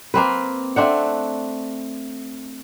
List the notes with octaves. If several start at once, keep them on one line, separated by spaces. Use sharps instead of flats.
A#3 C4 B4
A3 C4 D4 F#5